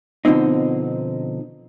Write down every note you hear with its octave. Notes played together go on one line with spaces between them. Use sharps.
B2 D3 F3 C4 D#4